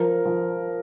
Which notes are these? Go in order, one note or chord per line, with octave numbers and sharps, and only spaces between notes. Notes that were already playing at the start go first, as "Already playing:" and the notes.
Already playing: F3 A#4
F3